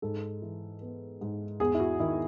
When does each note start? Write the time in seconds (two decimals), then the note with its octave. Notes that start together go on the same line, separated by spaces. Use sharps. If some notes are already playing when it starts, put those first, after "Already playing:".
0.02 G#2 A4
0.42 E3
0.81 B3
1.21 G#2
1.60 E2 G#4
1.74 E4
1.80 F#4
2.00 D#3 E4